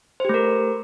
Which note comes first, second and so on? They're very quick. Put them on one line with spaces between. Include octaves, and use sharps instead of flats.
C5 G4 A3 A#4